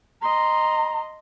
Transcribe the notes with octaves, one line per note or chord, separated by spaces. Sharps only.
D#5 A#5 C6